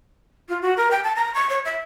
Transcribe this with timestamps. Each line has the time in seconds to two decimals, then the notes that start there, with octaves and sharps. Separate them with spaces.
0.49 F4
0.61 F#4
0.77 A#4
0.90 G5
1.03 A5
1.15 A#5
1.34 C#6
1.49 C#5
1.65 E5